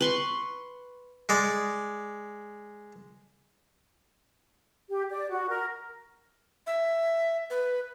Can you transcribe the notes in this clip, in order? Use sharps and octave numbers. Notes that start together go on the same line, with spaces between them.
B4 C6 C#6
G#3 D5
G4
D5
F#4
A#4
E5
B4